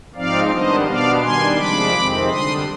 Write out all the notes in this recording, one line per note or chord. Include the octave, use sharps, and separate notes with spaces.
G#2 F3 C4 D#4 D5 F5
D#3 G3 B3 D4 C5 D#5
B2 B3 D4 D5 F5
D#3 G3 D4 G#5 C6
C3 F3 G#3 D4 B5 D6
F2 C3 D#3 G#3 C4
D3 G3 D4 C6 D#6